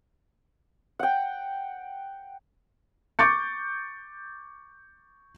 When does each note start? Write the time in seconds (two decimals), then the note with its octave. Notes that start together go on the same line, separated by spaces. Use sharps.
0.99 F#5 G5
3.19 C#6 D6 G6 A6 C#7